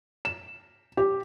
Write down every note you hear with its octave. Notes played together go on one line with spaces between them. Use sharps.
E7
G4